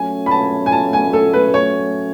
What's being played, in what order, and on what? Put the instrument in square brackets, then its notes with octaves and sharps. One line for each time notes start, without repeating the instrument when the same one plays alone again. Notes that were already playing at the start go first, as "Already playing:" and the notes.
Already playing: [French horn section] F#3 A3 C#4 [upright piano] G#5
[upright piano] B5
A5
G#5
A5
G#5
A4
B4
C#5